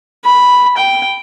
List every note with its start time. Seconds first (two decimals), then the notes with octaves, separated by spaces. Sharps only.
0.25 B5
0.78 G5